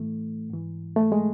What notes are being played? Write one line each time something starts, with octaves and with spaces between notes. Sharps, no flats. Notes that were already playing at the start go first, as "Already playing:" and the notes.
Already playing: A2 E3 A3
G#2 E3
A3
G#3